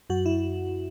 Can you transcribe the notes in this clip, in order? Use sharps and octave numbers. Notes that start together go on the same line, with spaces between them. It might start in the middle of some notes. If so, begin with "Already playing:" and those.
F#2 F#4
E4